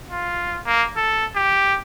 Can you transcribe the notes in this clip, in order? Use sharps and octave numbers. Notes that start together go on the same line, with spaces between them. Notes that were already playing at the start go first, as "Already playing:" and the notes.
F4
A#3
A4
G4